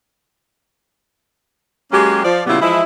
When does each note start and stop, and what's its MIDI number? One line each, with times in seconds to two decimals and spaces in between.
1.92 2.21 54
1.92 2.21 56
1.92 2.21 58
1.92 2.21 61
1.92 2.21 67
2.24 2.42 53
2.24 2.42 74
2.46 2.57 46
2.46 2.57 49
2.46 2.57 55
2.46 2.57 59
2.46 2.57 64
2.46 2.57 65
2.61 2.82 52
2.61 2.82 53
2.61 2.82 56
2.61 2.82 64